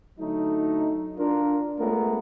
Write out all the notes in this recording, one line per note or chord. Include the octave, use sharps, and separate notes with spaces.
D3 F#3 A3 D#4
D4 F4 A#4
G#3 A3 B3 C#4 F4 A#4